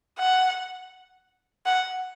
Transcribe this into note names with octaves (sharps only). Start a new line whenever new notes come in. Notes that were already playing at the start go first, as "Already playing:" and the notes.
F#5
F#5